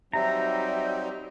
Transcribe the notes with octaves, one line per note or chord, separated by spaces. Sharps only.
F#3 G3 C4 D#4 E5 A#5